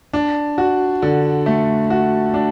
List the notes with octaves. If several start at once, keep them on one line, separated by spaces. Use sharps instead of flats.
D4
F#4
D3
A3
F#4
D4